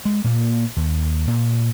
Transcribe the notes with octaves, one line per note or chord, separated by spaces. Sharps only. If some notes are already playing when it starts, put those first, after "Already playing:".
G#3
A#2 A#3
D#2
A#2